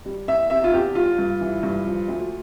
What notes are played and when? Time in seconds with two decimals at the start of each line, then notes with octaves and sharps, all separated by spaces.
0.05 G3
0.28 E2 E5
0.50 C3 E5
0.64 F4
0.73 E2 G4
0.95 G3 F4
1.18 G2
1.41 E3
1.63 G2
1.86 F3
2.08 D2